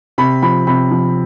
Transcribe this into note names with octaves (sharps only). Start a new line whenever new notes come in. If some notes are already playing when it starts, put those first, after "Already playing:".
C3 B5
F3 B5
C3 B5
F3